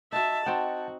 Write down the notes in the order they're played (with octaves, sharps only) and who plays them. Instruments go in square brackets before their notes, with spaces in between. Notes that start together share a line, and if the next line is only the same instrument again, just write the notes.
[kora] D#4 F#4 [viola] E5 A5
[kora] C4 D#4 [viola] F#4 [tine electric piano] F#5 G5 A5